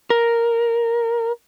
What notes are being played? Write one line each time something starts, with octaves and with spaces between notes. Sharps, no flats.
A#4